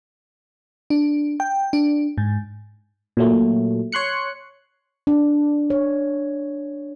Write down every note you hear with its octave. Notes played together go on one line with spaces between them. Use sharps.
D4
G5
D4
G#2
A#2 F#3 A3
C#5 C6 F#6 C#7
D4
C#5